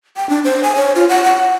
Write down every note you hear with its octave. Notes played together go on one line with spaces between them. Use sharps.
G5
D4
C5
G#5
C#5
F4
F#5
F#5